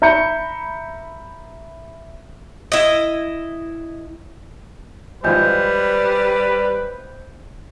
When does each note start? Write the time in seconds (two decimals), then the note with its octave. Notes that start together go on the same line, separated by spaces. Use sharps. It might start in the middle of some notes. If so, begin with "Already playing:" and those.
0.02 E5 A#5 B5 G6 C#7
2.72 E4 D#5
5.24 G#1 F3 G3 F4 B4 C5 G6